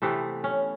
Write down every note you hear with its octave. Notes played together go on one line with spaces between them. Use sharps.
C3 E3 A3 B3
C#4